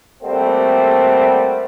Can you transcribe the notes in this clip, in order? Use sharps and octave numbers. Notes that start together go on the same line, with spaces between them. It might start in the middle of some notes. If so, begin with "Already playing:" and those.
G3 A3 A#3 C4 F#4